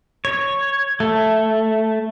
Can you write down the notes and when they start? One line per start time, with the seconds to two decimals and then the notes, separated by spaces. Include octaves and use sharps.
0.25 C#5
1.00 A3